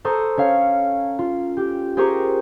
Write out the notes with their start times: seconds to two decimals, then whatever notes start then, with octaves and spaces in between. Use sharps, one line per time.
0.05 A4 C5 A#5 C#6 D#6
0.37 C#4 C#5 F5
1.19 F4
1.57 G4
1.97 G4 G#4 A#4 C5 A#5 C#6